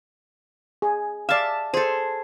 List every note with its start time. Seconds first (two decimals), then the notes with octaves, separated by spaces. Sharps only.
0.82 G#4
1.29 D5 E5 F5 A5
1.74 G#4 A4 C5